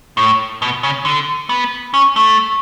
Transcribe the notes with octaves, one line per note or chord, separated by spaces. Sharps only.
A2
B2
C#3
D3
B3
C#4
A3